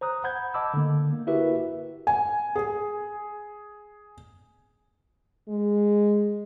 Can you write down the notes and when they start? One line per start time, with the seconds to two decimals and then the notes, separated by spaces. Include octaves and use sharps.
0.01 C5 A#5 D#6 F#6
0.24 F#5 B5 G6 G#6
0.54 D#5 A5 B5 D6 E6
0.74 D3 A#3
1.13 A#3
1.27 E4 F#4 G4 A#4 B4 E5
2.07 G#5
2.55 G#4
5.49 G#3